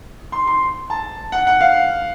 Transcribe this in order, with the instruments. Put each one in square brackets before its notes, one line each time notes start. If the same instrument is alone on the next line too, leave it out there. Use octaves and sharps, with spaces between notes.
[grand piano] C6
C6
A5
F#5
F#5
F5